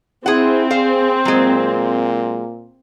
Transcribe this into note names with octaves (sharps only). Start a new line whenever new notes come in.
C4 E4 G#4 F#5
G#4 C5 F5
A#2 F#3 G#3